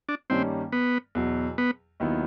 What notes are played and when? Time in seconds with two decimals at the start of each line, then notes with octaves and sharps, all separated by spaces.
0.09 D4
0.30 G2 D#3 G3 A#3 C4 C#4
0.72 B3
1.15 E2 B2 F#3
1.58 B3
2.00 D#2 D#3 F#3 B3 E4